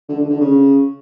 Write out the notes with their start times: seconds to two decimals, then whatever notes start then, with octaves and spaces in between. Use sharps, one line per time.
0.09 D3
0.19 D3
0.30 D3
0.40 C#3